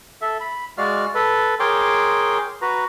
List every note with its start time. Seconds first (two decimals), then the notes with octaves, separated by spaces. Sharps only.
0.22 A4 E5
0.40 B5
0.78 G#3 F#4 D5 F5 F6
1.15 A4 B4
1.60 G#4 A#4 C#5 G5 C6 D6
2.62 F#4 B4 A#5